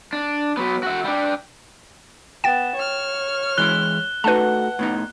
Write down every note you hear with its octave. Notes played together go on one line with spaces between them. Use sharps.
D4
F#3 B3
F#4 E5
G3 D4
B3 G5 A6 E7
C#5 F6
E3 G#3 E4 F#6 G7
A3 D#4 F#4 B4 F#5 A5
A2 B3 D#4